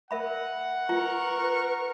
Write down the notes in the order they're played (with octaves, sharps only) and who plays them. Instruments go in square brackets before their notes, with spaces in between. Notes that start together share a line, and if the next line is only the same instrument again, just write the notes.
[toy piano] A#4 E5 B5 [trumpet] F#5
[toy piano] F4 [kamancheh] A#4 C#6 [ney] B4